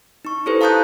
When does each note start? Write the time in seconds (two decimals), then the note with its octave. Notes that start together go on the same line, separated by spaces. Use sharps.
0.25 D#4 C#6
0.46 E4 G4 A4 B4 C5
0.61 F5 A5 A#5 D#6 F#6 G6